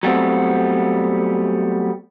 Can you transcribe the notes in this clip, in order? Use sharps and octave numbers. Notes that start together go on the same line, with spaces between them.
F#3 G3 A3 B3 C4